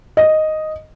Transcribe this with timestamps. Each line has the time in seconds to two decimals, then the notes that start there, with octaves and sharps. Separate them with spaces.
0.17 D#5